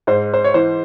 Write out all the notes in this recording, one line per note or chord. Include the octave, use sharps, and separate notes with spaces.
G#2 C5
C5
C#5
E3 C5